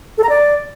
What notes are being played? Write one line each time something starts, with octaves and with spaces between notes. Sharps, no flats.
A4
A#5
D5